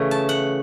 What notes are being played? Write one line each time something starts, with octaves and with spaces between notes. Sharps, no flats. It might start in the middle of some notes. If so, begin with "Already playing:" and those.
Already playing: C#3 E3 A3
A5
F#5